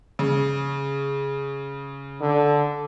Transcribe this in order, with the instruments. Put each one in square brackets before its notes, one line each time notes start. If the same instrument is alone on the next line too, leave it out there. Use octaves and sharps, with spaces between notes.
[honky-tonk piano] C#3
[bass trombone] D3